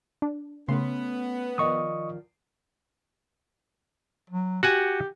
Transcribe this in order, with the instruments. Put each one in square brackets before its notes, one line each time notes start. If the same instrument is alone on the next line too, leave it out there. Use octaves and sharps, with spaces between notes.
[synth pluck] D4
[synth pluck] C#3 C6 [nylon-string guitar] A3 C#4 B4 [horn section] B3
[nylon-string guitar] D#3 F3 D5 [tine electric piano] D#5 C#6 D#6
[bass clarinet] F#3
[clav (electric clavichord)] F#4 F#5 G#5 [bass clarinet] G4